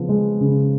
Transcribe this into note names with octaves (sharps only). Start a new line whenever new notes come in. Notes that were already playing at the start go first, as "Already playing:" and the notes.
Already playing: C#3 F3 B3
G#3
C#3